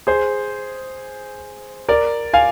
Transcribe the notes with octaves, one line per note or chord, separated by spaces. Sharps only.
G#4 C5
A#4 D5
F5 G#5